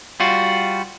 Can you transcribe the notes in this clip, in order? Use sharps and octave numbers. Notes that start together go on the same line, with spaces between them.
G3 F4 F#4